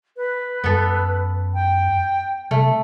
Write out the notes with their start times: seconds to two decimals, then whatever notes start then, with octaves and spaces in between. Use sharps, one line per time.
0.17 B4
0.64 F#2 B3 A4
1.54 G5
2.51 C3 A3